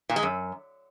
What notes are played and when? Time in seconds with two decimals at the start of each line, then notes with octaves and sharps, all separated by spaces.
0.10 A#2
0.16 G#3
0.23 F#2